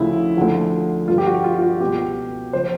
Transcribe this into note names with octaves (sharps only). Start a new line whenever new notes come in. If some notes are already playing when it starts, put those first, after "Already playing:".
Already playing: D2 C#3 F3 E4
D2 D3 F3
G2 D3 F3 F4
G4
F#4
F4
F4
F#4
C#2 B2 G4
C#3 F3 C5